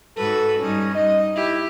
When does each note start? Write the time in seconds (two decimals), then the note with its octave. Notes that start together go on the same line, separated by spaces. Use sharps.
0.17 G#2 F#4 A4 B4
0.60 G2 G3 C#4 D#4
0.95 G3 D#4 D#5
1.36 E4 G4